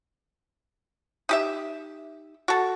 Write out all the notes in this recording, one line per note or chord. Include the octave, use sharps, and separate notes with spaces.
D#4 G4 E5
F#4 A4